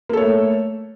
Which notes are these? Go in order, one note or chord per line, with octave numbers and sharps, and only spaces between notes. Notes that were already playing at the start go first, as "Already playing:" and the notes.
A3 A#3 A4 C#5